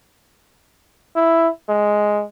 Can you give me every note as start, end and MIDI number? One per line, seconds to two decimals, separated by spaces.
1.16 1.48 64
1.69 2.23 56